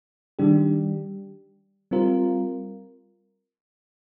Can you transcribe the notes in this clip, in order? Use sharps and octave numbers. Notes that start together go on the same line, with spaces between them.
D#3 G3 D4 G4
G3 C4 F4 A#4